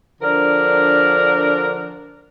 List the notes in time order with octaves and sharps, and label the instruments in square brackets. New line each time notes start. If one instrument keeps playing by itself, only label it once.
[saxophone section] D3 F3 D4 A#4